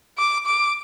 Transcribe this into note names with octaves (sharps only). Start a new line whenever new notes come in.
D6
D6